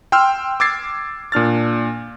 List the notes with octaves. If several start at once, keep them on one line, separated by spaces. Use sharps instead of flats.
G5 C6 E6 F6
D6 E6 G#6 A6 C7
A#2 D4 F6 A6